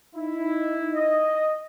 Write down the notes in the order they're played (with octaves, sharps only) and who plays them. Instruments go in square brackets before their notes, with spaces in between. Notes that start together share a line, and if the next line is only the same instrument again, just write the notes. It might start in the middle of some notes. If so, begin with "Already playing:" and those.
[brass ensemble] D#4 E4
[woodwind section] D#5